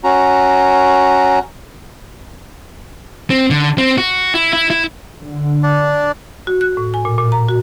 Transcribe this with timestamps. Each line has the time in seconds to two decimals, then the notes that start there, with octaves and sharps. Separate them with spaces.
0.04 C#4 F#4 A#5
3.30 C4
3.50 D3
3.78 C4
3.98 F#4
4.34 E4
4.53 E4
4.70 E4
5.19 D3
5.63 D4 D5
6.47 F#4
6.61 F#6
6.77 A2
6.94 G#5
7.05 A#2
7.18 A#2
7.32 A#5
7.49 F#4